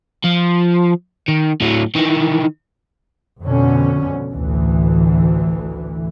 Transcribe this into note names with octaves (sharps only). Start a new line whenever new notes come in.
F3
D#3
A2 F#3
D#3 E3
F2 B2 D3 C#4
A1 D2 E3